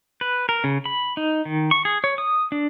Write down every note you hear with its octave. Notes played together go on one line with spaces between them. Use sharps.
B4
A#4
C#3
B5
D#4
D#3
C#6
G#4
C#5
D#6
D4